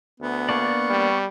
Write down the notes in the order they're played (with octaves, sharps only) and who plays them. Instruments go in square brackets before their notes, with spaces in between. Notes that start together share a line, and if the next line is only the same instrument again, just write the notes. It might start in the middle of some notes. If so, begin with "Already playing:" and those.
[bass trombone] D2 [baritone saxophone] B3
[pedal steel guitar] A#3 D4 D5 [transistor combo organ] C#6
[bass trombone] G3